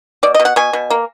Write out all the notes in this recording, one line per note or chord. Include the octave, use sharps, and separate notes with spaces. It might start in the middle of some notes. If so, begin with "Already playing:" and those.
B2 D5
D#5
B2
F#5
B2 G#5
B2
A#3